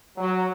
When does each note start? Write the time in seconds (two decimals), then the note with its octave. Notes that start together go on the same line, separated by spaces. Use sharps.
0.18 F#3